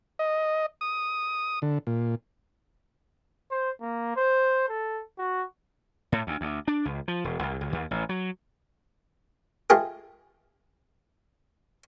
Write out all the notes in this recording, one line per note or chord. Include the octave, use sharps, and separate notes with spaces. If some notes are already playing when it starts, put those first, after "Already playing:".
D#5
D#6
D3
A#2
C5
A#3
C5
A4
F#4
A2
D2
D2
D4
C#2
F3
E1
C2
C#2
D#2
A1
F#3
G#3 A3 F4 G4 G#4